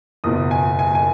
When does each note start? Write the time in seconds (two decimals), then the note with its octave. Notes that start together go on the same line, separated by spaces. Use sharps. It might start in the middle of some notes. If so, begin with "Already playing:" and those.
0.24 F#1 E2 B2 D#6
0.51 G#5
0.79 G#5
0.95 G#5